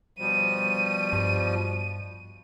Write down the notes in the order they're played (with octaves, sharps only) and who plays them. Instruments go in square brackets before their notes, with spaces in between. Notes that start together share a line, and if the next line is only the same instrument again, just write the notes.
[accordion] B2 F3 G3 [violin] D#7
[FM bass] G2